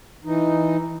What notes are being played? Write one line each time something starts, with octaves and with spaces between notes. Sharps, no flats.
E3 D#4